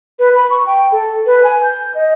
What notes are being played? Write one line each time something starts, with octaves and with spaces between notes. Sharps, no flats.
B4
B5
C#6
G5
A4
B4
G#5
G6
D#5